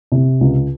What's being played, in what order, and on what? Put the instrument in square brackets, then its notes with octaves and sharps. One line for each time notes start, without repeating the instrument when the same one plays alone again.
[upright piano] C3
C#2